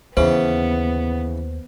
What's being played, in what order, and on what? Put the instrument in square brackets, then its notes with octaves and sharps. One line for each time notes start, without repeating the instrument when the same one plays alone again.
[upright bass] D#2 [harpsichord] C#3 E3 [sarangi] B3 [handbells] C5